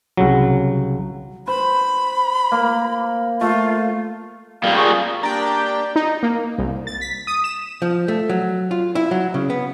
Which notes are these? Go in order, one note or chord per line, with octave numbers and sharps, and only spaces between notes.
C2 C#3 F#3
C5 B5
A#3
A3 F4
A#2 G3 A#3 A#4 F5
G#4 C#6 D#6
A#3 D4 G4 D5 G5 A#5
D#4
A#3
C2
A6
B6
D#6
E7
F3
A3
F#3
F4
E4
F#3
C#3
B3